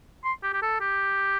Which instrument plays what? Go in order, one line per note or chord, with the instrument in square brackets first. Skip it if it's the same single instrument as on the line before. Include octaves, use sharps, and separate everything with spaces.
[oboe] C6
G4
G4
A4
G4